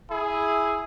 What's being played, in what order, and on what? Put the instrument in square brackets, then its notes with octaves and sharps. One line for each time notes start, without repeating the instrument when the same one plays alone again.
[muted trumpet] E4 [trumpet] G#4